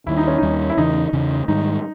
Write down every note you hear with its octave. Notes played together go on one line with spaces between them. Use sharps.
D#2 D#3 G3 E4
D#4
C#4
D#2 D#3 G3 D#4
E4
E2 C#3 E3 D#4
E2 C#3 E3
G#2 D#3 G3 D#4